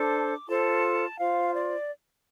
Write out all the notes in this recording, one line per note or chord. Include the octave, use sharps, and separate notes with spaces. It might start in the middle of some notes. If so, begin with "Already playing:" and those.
Already playing: D4 A4 C5 D6
F4 A4 C5 A5
F4 C5 F5
D5